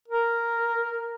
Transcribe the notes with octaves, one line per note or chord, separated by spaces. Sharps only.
A#4